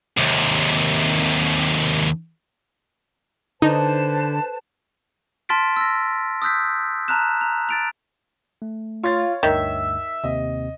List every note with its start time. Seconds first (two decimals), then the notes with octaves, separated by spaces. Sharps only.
0.17 D#2 C3
3.62 D3 D#4 B4 C5 A5
5.49 A5 C6 F6 A6 B6 D7
5.77 E6 A#6
6.42 D#6 E6 F#6 G6 B6
7.08 A5 A#5 F6 F#6 E7
7.41 A#5
7.69 A6 D7 F7
8.62 A3
9.03 F4 C#5 A6
9.43 D2 G2 D#3 E5
10.24 D#2 C3 C4 D#5